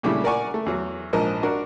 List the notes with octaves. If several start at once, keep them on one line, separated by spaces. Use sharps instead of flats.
A#2 C#3 G3 A3 D4 E4
A#4 D5 F#5 G#5 C#6 D6
A3
E2 F#3
A#1 G#2 F3 A#4 D#5
D4 F#4 A#4